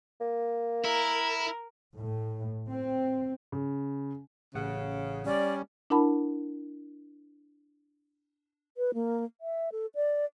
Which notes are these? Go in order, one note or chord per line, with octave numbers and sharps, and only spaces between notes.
A#3
E4 A#4
A2
C4
C#3
A1 C#3 F#5
G3 C#4 D5
D4 E4 A#4 F#5 A5 B5
B4
A#3
E5
A4
D5